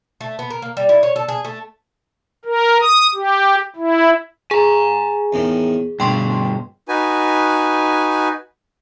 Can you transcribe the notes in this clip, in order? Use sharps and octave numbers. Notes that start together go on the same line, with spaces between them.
A3
B3
A#4
A#3
G3
E4
C#5
A4
G#4
A3
A#4
D#6
G4
E4
G#4 G#5 A#5
E2 A2 D#3
G2 B2 D4 G5 C6 C#6
D#4 F#4 B4 G#5